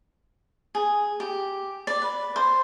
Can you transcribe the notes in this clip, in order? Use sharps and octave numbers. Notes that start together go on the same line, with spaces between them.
G#4
G4
D5
B4
C5